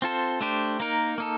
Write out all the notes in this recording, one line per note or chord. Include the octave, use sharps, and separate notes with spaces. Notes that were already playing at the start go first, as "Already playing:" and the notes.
C4 F4 A4 C5
A3 D4 G4 C5
A#3 D#4 A#4
A#3 D#4 A4